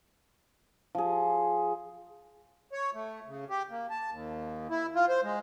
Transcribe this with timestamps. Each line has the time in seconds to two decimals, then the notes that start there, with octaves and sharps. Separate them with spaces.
0.95 F3 G#4
2.72 C#5
2.94 A3
3.27 C#3
3.50 G4
3.70 A#3
3.90 A5
4.10 D#2
4.70 E4
4.95 F4
5.08 C5
5.23 G#3